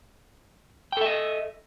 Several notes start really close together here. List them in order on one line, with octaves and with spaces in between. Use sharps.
G5 A4 E5 D#5